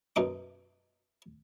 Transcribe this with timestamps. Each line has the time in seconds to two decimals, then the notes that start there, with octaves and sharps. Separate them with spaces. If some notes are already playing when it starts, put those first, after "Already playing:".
0.16 F#2 B2 D#4 D6